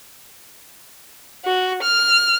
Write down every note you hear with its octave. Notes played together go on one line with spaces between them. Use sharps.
F#4
F6